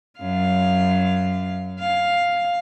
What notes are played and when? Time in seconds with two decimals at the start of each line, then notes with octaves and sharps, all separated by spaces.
0.19 F#2 F5
1.80 F5